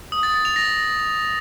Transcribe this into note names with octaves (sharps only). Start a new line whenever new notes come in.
D#6
A6
A6
F7
A#6